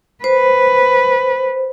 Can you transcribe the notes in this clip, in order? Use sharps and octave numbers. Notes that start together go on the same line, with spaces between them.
B4 C5